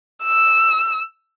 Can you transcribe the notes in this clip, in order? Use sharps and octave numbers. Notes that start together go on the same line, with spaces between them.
E6